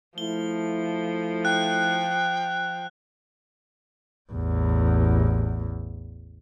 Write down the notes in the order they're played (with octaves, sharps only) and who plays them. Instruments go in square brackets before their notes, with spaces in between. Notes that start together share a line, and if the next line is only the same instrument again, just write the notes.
[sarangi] F3 [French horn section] A3 E4 [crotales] G7
[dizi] G5 [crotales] F#6
[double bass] A1 E2